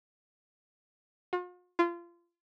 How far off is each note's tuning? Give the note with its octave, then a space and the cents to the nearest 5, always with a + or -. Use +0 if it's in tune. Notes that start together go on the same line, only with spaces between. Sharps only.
F4 +45
F4 -25